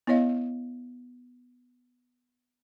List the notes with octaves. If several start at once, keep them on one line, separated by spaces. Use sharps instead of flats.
B3 E4 C#5 D#5 F5